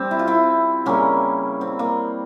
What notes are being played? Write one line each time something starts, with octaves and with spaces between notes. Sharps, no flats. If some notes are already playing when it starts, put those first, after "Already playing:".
Already playing: G3 C4 G4
E4
F4
C4 E4
C#3 G3 A#3 C#4
C4
A#3